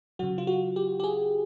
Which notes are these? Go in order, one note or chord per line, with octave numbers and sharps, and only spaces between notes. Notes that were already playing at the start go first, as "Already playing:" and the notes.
C#3 F#3 F#4
F4
F#4
G4
G4
G#4